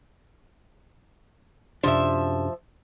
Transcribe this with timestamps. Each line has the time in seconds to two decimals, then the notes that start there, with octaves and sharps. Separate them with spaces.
1.84 F#2 C3 F3 D4 E5